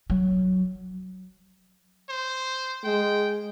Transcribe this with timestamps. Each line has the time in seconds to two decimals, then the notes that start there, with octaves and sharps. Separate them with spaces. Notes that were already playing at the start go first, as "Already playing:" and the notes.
0.10 F#3
2.09 C5
2.84 G#3 G5